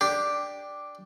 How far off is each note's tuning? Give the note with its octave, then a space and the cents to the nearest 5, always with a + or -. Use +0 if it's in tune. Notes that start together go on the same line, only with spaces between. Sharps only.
D4 +0 G4 +0